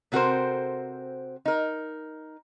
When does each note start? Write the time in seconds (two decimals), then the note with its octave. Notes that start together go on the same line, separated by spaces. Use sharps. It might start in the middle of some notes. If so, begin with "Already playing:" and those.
0.12 C3 C4 F#4 A4 A#4 C5
1.46 D#4 A#4